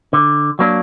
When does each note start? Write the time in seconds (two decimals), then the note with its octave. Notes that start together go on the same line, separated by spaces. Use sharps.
0.13 D3
0.59 F#3 A#3 D4